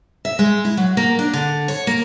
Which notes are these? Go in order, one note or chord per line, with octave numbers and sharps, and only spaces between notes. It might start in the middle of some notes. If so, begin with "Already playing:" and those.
E5
G#3
E4
F#3
A#3
D4
D3
C#5
A#3